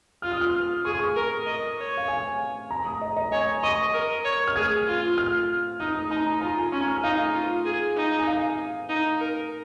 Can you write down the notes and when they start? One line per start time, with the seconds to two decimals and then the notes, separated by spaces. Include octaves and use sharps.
0.22 F4 F6
0.32 D#6
0.41 F6
0.85 G#4 C#6
0.92 D#6
0.99 C#6
1.16 A#4
1.46 D#5
1.78 C#5
1.97 F5
2.08 G#5
2.71 A#5
2.85 D#6
3.02 D#5
3.17 D#5
3.32 C#5 G#5
3.63 D#5 C#6
3.93 A#4
4.24 C#5
4.47 F6
4.56 G#4 G#6
4.87 F4
5.18 F6
5.80 D#4 D#6
5.95 D#6
6.10 D#4 A#5
6.27 A#5
6.41 F4 A#5
6.57 G#5
6.72 C#4 C#6
6.88 F6
6.98 G#5
7.03 D#4 F5
7.34 F4
7.65 G#4
7.96 D#4
8.19 G#5
8.27 F5
8.89 D#4
9.20 A#4